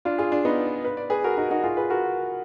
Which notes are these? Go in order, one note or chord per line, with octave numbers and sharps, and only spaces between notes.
D4 F4
F4 G#4
D4
B3 D#4
B4
D5
G#4 B4
F#4 A#4
D#4 F#4
D#4 F#4
F4 G#4
G#4 B4
F#4 A#4